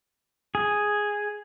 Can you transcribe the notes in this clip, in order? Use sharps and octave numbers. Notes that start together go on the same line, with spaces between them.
G#4